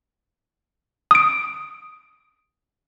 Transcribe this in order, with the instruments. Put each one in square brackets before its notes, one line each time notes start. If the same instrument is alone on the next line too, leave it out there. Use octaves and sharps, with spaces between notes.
[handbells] D#6 D7